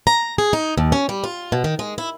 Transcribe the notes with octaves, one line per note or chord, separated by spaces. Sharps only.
A#5
G#4
D#4
D#2
C#4
G3
F4
B2
D#3
G#3
E4